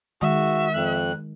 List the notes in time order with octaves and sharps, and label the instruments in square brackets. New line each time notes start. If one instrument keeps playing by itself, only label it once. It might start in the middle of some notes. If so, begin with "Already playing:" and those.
[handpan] D#3 G#3 [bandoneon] F#4 [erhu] E5
[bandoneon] F2 F#6